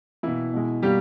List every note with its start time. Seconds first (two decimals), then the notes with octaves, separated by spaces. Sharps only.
0.23 B2 E3 A#3 E4
0.53 B2 G#3
0.83 B2 G3 A#3 G4